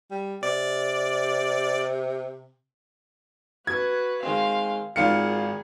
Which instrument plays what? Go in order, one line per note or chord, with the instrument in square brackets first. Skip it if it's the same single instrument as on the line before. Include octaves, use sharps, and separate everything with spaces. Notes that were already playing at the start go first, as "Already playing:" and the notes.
[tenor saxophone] G3
[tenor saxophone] C3 [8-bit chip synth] D5
[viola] F#4 B4 [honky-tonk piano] G#6
[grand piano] D#3 G#3 C4 [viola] F5
[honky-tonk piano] G#1 D#3 C#7 [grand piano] F4 F5 [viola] G#4